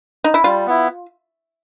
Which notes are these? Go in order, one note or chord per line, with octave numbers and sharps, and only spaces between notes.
D#4
E4
G3 F4
B3 E4